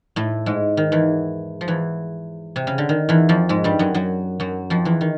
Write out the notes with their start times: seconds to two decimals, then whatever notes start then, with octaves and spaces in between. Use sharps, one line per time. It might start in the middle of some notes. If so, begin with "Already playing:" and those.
0.16 A2 A3
0.46 G#2 G#3
0.77 D#3
0.92 E2 E3
1.61 F3
1.68 E2 E3
2.56 C3
2.67 C#3
2.78 D3
2.89 D#3
3.09 E2 E3
3.29 F2 F3
3.49 G#2 G#3
3.64 G2 G3
3.79 F#2 F#3
3.94 F#2 F#3
4.40 F#2 F#3
4.70 F2 F3
4.85 E2 E3
5.01 D#3